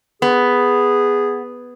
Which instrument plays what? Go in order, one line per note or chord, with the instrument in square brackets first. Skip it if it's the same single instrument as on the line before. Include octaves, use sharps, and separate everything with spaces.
[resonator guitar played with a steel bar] B3 [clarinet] G#4